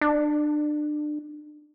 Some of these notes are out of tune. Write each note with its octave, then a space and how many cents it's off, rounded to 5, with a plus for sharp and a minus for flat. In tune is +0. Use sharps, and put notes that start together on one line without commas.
D4 +30